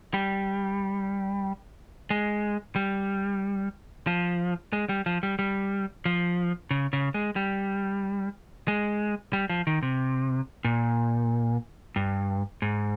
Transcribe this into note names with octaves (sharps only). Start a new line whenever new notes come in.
G3
G#3
G3
F3
G#3
G3
F3
G3
G3
F3
C#3
C#3
G#3
G3
G#3
G3
F3
D#3
C3
A#2
G2
G#2